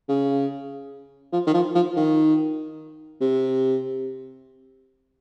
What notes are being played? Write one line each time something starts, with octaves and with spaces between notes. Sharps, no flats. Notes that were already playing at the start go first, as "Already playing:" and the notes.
C#3
F3
D#3
F3
F3
D#3
C3